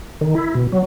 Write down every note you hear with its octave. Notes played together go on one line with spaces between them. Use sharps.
D#3
E4
B2
F#3